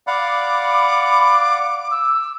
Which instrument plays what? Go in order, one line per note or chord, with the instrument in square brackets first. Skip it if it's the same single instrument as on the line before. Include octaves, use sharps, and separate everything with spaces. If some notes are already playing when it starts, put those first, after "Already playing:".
[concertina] D5 F5 F#5 [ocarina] B5 [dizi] D6
[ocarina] E6